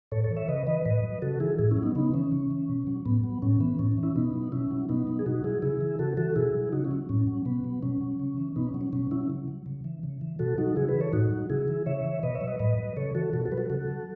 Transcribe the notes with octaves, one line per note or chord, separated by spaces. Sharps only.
A2 A4 C#5
A4 C#5
E3
C#5 E5
C#3 B4 D#5
E3 B4 D#5
A2 B4 D#5
F#3
C#3 F#4 A4
E3 E4 G#4
A2 E4 G#4
C#4 E4
F#3
B3 D#4
C#3 B3 D#4
E3 C#4
C#3
E3
B2
F#3
A2 B3
F#3
A2 C#4
E3 B3
A2 C#4
C#4
E3
C#4 E4
B2 B3 D#4
F#3
B2 C#4 E4
F#3
B2 B3 D#4
F#3
G#4
B2 D#4 F#4
F#3 E4 G#4
C#3 E4 G#4
E3
C#3 F#4 A4
E3 F#4 A4
B2 E4 G#4
F#3
C#3 D#4 F#4
C#4 E4
F#3
A2 C#4
F#3
B2 B3
F#3
B2 C#4
F#3
C#3
E3
B2 B3 D#4
C#4
F#3
C#4
B2 C#4
F#3 C#4 E4
C#3
F#3
C#3
E3
C#3
E3
B2 F#4 A4
F#3 D#4 F#4
C#3 E4 G#4
G#4 B4
E3
A4 C#5
A2 D#4 F#4
F#3
C#3 E4 G#4
E3
C#3 C#5 E5
E3
B2 B4 D#5
C#5 E5
F#3
B4 D#5
A2 B4 D#5
F#3
C#3 A4 C#5
E3 F#4 A4
B2 F#4 A4
F#4 A4
F#3 B4
F#4 A4
C#3 F#4 A4
F#3